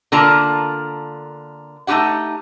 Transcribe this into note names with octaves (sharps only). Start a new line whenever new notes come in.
D3 A#3 F4 A#4 A5 A#5
A3 D#4 F4 G4 F#5